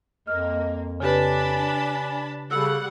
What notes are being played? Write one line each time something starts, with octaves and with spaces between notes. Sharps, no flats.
F2 A#3 D#5 F6
C#3 D4 G4 B4 G#5 A5 B5
C#3 G3 A4 F#5 B5 E6